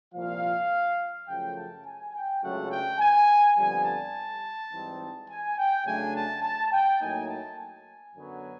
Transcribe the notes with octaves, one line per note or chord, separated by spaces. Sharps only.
C2 A#2 F3 F5
F#2 C#3 F3 A3 G5
A5
G#5
G5
C#2 C#3 F#3 A3 D4 F#5
G5
G#5
F2 D3 G3 B3 G#5
A5
G#2 E3 G3 C4 D#4
G#5
G5
C#3 F#3 A3 D4 G#5
A5
A5
G5
A2 F#3 A#3 D#4 G#5
A5
G#5
F#2 D3 F#3 B3